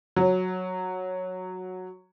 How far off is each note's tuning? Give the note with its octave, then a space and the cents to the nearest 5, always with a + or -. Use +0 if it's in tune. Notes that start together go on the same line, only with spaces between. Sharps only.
F#3 -5